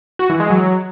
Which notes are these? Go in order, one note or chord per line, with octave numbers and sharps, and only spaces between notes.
F#4
E3
G#3
F#3